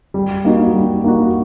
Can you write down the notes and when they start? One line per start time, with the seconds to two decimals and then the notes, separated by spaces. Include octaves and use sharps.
0.14 G3
0.44 A#3 D#4 F#4
0.74 G3
1.04 A#3 D#4 F#4